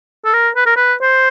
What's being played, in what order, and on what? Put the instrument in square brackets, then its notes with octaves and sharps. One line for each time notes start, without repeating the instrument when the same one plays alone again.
[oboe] A4
A#4
B4
A#4
B4
C5